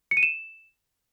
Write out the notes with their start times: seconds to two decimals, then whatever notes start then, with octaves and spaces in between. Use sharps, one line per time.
0.11 C#7
0.17 D#7
0.23 E7